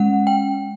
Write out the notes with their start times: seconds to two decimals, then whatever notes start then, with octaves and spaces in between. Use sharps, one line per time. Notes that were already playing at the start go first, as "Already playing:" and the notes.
Already playing: G#3 C#4 F#5
0.27 G5